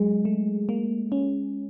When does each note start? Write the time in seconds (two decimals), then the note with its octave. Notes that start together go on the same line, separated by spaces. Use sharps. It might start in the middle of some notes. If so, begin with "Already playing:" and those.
Already playing: F#3 G#3
0.25 A3
0.69 A#3
1.12 C#4